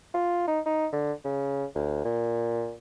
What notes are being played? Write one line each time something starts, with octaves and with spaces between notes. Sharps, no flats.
F4
D#4
D#4
D3
C#3
D2
A#2